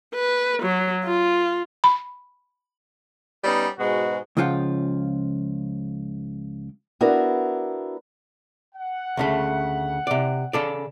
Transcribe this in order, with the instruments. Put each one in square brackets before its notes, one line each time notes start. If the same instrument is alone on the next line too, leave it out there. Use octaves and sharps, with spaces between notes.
[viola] B4
F#3
F4
[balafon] B5
[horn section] G3 B3 C#4 D#4
G#2 B2 G#3 F#4
[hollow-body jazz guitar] C#2 C#3 F3 F4 F#5 G5
[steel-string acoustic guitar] B3 D4 E4 F#4 A#4
[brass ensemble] F#5
[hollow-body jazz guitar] D2 C#3 A3
C3 D5
C#3 A4 D5